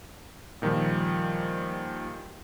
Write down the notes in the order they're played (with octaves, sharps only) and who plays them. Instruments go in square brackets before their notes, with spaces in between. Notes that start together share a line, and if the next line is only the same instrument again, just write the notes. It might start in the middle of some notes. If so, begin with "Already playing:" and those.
[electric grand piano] A#2 D#3 F3 G3